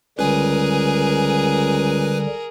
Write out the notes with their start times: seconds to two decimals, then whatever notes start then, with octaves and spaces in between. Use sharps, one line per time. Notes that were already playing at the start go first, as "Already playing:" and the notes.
0.19 C#2 D3 G3 G#4 A#4 B4 G#5